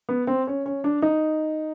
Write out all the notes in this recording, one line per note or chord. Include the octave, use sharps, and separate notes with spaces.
B3
C4
C#4
C#4
D4
D#4